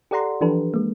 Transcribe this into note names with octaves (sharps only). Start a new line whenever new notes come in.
G4 A4 D5 F#5 A#5 C6
E3 F3 D4 G4 A4 B4
G#3 A#3